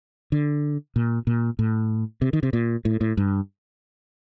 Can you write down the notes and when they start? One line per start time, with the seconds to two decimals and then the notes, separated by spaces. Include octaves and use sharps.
0.32 D3
0.96 A#2
1.27 A#2
1.59 A2
2.22 C3
2.33 D#3
2.43 C3
2.53 A#2
2.85 A2
3.01 A2
3.17 G2